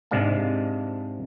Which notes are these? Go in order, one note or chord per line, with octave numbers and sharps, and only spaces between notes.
G#2 C3 G#3 D4 F5 A5